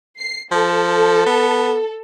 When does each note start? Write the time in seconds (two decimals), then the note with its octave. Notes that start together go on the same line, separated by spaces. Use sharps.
0.18 C7
0.51 F3 A4
1.26 B3